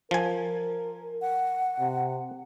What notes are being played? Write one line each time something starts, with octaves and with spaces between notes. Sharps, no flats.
F3 A#4 G#5
F#5
C3